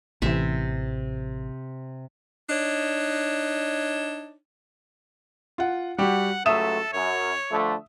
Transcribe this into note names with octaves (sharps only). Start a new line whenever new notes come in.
A1 C3 E3 E5
D4 D#4 C#5
F4 F#5
G3 F#4 G4 F#5
C#2 F#3 A3 A4 E5 D#6 E7
F#2 C#5
D3 F3 A3